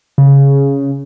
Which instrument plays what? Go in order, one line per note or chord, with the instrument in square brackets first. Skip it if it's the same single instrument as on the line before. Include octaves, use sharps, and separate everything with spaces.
[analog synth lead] C#3